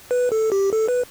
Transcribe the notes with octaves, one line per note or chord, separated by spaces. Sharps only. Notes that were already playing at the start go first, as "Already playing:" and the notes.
B4
A4
G4
A4
B4